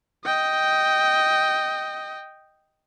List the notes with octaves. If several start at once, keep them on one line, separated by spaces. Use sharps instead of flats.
D#5 G5